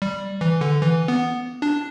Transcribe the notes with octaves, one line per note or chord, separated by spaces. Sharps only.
G3
E3
D3
E3
B3
D4